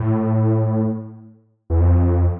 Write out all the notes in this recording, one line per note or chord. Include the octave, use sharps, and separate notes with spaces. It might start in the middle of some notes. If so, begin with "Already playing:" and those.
Already playing: A2
E2
F2